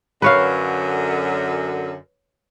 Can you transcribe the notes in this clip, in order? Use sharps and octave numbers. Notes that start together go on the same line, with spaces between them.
F#2 D3 B4 C#5 F5